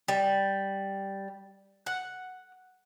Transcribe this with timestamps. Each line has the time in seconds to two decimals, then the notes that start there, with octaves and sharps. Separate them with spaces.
0.08 G3
1.86 F#5